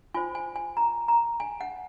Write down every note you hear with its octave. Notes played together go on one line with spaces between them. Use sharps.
F4 C5 G#5
G#5
G#5
A#5
A#5
G#5
F#5